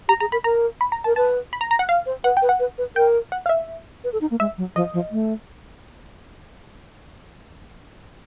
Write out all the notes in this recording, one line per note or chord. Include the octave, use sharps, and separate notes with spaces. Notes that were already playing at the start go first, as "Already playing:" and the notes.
G4 A#5
G#4 A#5
A#4 B5
A#4 A#5
B5
A#5
A#4 A5
B4 A5
B5
A#5
A#5
F#5
F5
C5
B4 F#5
G5
B4
F#5
B4
B4
A#4 G5
F#5
F5
E5
B4
A4
D#4
A#3
G#3 E5
F#3
F3 D#5
F3
A3